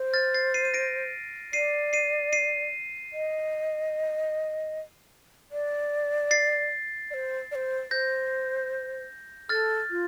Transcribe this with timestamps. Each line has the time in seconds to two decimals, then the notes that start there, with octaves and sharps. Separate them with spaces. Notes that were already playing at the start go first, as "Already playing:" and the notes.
Already playing: C5
0.13 F6 A6
0.34 A6 C7
0.54 C7 D#7
0.65 D#7
0.74 A#6 D7
1.53 D5 C7 D#7
1.93 C7 D#7
2.32 C7 D#7
3.13 D#5
5.52 D5
6.31 A6 C7
7.11 D5
7.14 C5
7.51 D5
7.55 C5
7.91 C5 G6 A#6
9.49 A4 F6 A6
9.90 F4